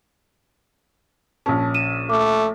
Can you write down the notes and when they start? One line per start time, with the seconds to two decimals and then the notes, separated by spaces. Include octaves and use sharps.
1.46 A#1 C#4 A5
1.74 D#7 E7
2.10 A3 D6